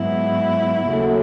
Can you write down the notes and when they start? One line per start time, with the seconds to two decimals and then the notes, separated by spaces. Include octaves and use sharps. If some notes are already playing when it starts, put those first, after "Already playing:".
Already playing: G#2 F#3 B3 E4
0.86 D#2 C#3 F#3 A3